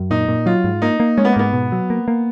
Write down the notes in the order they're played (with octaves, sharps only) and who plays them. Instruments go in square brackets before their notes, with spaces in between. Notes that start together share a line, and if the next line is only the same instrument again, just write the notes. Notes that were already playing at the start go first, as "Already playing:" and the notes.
Already playing: [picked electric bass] F#2
[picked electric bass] A#2 [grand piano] D#4
[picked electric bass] A#2
[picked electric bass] F#3 [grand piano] F4
[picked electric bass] G#2
[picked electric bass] A#3 [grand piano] D#4
[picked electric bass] A#3
[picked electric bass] G#3 [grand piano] C#4
[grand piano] B3
A#3
[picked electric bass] G#2 [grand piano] B3
[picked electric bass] B2
F#3
A#3
A#3